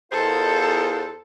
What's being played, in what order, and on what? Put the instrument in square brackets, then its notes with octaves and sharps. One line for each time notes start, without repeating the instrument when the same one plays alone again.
[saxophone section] E2 C5 [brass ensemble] F4 A#4 D#5 [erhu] A4